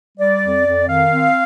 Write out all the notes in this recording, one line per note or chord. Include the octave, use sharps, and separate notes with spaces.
G3 D5
F2
F2
D#3 F5
C4